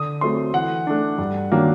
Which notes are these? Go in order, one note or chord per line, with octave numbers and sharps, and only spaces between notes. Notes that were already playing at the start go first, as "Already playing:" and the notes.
Already playing: D3 D#6
F#3 A3 C4 C6
E3 F#5
A3 D4
G2
D#3 F#3 A#3 D4